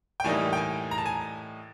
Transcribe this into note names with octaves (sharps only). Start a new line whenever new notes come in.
G5
A2 E3 G3 A#3 D#4 G#5
G5
G#5
A#5
A5
G#5